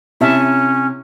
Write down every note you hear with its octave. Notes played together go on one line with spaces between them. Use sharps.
C3 C#4 E4 E5 A5